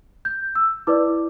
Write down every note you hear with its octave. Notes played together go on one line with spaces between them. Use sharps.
G6
E6
E4 B4 D5 D6